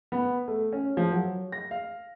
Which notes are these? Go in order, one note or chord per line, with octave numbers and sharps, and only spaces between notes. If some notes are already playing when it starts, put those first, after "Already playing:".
B3
A3
C#4
F3
F#3
A#6
F5